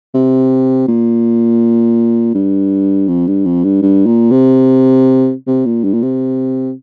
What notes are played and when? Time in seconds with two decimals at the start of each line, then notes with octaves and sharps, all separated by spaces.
0.14 C3
0.88 A#2
2.35 G2
3.08 F2
3.27 G2
3.45 F2
3.64 G2
3.82 G2
4.06 A#2
4.31 C3
5.47 C3
5.66 A#2
5.84 G2
5.94 A#2
6.02 C3